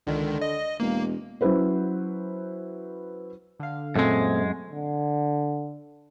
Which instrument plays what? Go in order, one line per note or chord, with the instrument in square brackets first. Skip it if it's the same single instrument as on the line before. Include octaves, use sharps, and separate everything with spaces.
[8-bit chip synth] C#2 D#3 [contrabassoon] D3
[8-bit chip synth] D#5
[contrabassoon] E1 [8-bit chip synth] A#3
[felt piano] F#3 C#4 E4 B4 C5
[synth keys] D3 F5
[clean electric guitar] F#2 G#3 [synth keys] A#2 A3 C4
[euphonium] D3